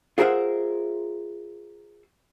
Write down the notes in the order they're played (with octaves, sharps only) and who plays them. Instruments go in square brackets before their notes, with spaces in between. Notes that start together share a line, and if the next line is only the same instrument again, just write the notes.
[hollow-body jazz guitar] F4 G#4 A#4 C5 E5 F#5